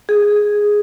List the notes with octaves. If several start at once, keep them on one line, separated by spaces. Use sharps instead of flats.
G#4